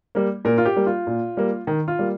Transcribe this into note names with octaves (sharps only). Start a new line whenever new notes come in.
G3 A#3
A#2 A#4
F4
G4
G3 A#3
F4
A#2
G3 A#3
D#3
F4
G3 A#3